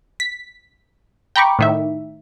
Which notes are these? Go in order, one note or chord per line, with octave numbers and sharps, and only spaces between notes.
B6
G5 A#5 B5 C#6 D6
A2 D#3 E5